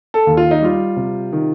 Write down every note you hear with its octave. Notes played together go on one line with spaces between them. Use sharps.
A4
D#2
F4
D#4
G3 F4
C3
D#3